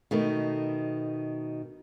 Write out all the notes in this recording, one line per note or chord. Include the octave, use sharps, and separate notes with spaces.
B2 D#3 A3